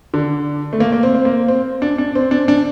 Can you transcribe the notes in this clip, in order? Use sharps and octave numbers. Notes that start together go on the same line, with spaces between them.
D3
A3
A#3
A#3
C4
C4
A#3
C4
D4
D4
C4
D4
D4